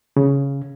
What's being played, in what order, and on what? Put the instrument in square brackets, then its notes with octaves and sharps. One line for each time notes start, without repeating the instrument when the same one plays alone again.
[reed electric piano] C#3